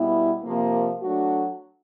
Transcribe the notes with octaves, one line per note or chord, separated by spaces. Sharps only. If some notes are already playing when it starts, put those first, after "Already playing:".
Already playing: B2 G3 B3 E4
C3 F3 A#3
F#3 A3 D4 F#4